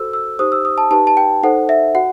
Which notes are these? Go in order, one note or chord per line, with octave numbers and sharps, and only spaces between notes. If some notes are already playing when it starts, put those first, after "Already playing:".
Already playing: F#4 A4 C5 E6
E6
D#4 G4 C5 D#6
E6
D#6
A5
D#4 G4 B4 A5
A5
G5
D#4 A4 C5 F#5
E5
F#4 F#5